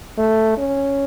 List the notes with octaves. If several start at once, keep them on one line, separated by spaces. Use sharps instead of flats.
A3
C#4